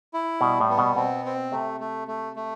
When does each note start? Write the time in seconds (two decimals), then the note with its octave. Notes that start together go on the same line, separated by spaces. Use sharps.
0.14 E4
0.41 B2 G3
0.60 A2
0.70 B3
0.78 B2
0.96 B2 C4
1.25 C4
1.52 C3 A3
1.80 A3
2.08 A3
2.36 A3